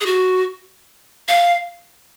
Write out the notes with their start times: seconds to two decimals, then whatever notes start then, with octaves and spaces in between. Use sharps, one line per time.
0.01 G#4
0.06 F#4
1.28 F5